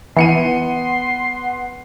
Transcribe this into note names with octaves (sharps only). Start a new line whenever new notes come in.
E3 B3 F#5 C6 C#7 D#7